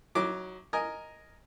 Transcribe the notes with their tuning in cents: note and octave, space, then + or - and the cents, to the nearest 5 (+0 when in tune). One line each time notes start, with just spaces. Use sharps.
F#3 +0 D#4 +30 D6 +0
A#4 +0 D#5 +0 G#5 +5